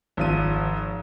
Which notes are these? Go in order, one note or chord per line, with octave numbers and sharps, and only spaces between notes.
G#1 F3 D#7